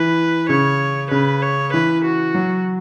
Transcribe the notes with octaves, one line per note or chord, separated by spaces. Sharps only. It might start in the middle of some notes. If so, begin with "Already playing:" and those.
Already playing: E3 B4
C#3 C#5
C#3 B4
C#5
E3 B4
F#4
F#3